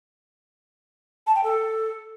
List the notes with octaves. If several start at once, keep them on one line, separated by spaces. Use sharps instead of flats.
A5
G5
A4